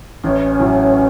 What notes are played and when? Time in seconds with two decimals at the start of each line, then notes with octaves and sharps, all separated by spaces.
0.24 A1 C#4
0.60 A2 F#3